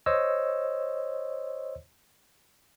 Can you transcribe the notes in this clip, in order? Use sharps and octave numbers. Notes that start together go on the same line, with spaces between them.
C5 C#5 D#5 E6